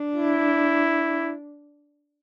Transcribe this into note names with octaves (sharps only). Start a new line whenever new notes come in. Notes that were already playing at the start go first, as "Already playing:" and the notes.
Already playing: D4
E4